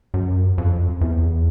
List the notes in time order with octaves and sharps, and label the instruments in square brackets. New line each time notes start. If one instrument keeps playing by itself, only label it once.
[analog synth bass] F#2
F2
E2